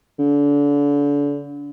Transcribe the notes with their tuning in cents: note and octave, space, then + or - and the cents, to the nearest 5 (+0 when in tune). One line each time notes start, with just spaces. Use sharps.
D3 -35